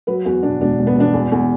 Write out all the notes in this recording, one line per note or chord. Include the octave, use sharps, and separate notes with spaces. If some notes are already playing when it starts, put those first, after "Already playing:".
F#3 B4
E2 F#4
B2 D4
E1 D4
E1
B3
E1 D4
E2
E2